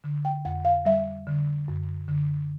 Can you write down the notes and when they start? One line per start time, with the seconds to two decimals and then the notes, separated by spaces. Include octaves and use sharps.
0.04 D3
0.25 G5
0.45 F2 F#5
0.65 F5
0.85 G3 E5
1.27 D3
1.68 F#2
2.09 D3